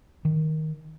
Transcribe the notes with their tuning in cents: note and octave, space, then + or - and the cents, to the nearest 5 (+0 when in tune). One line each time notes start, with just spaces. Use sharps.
D#3 +10